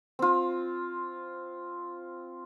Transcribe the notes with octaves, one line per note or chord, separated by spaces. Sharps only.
C4 F4